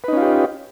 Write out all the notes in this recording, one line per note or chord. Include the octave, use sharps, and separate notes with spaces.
C#4 D#4 F4 G4 B4